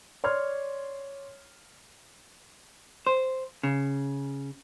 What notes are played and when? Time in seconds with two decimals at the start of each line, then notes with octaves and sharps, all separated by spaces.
0.24 C#5 D5 C6 F6 G#6
3.07 C5
3.63 C#3